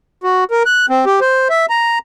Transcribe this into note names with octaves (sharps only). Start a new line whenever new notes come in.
F#4
A#4
F#6
C4
G4
C5
E5
A#5